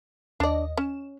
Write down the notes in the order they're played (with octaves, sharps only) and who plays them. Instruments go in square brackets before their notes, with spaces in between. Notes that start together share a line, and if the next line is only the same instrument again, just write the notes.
[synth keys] D#2 D#5 [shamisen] D4 D5
[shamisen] C#4 [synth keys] E7